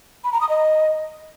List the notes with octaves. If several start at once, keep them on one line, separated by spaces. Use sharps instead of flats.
B5
A#5
D#6
D#5